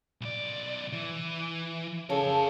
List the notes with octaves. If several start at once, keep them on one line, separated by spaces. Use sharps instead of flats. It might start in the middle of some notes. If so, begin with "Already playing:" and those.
B1 D5
E3
C#3 A4 A#4 C#5